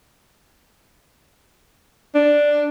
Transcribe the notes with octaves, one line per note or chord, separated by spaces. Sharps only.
D4